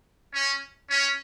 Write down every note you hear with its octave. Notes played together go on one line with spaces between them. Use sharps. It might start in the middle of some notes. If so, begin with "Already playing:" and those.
C#4
C#4